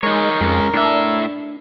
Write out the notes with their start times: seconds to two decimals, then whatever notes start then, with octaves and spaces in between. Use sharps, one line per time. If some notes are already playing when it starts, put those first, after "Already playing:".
0.03 G#3 D#4 A#4 C#5
0.41 F2 G#3 C4 C#4
0.74 A2 D4 E5